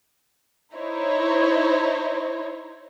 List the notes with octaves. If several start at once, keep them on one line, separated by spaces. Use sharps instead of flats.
D#4 E4 C5 C#5